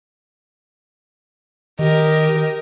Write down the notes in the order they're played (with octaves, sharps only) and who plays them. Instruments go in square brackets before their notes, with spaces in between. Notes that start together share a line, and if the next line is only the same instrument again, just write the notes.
[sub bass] D#3 [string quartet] G4 A#4 D#5